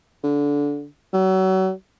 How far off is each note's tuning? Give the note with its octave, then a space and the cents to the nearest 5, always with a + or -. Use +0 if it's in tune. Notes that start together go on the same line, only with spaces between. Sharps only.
D3 -20
F#3 +30